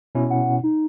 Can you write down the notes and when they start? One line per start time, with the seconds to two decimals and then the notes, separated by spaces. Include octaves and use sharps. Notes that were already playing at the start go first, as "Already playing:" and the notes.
0.15 B2 C#4 E4
0.30 F#5
0.64 D#4